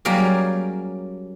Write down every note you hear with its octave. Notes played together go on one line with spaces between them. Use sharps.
F#3 G3 A#3 C#4 G#4